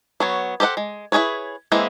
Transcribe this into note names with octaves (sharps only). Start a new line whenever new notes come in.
F#3 B3 C#5
G4 A4 C5 D#5 F#5
G#3
E4 F#4 G#4 B4 C#5
E3 G#3 A#3 C4 E4